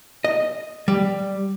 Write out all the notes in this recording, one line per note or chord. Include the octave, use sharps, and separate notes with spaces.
D#5
G3